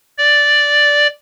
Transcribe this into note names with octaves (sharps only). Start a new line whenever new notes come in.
D5